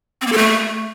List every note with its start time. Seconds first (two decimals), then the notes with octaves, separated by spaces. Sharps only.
0.22 C4
0.27 A#3
0.32 A4
0.38 A3